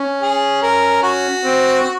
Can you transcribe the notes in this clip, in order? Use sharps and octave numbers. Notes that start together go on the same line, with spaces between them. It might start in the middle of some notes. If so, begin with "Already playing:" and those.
Already playing: C#4
G#4
A#4
F#4
C4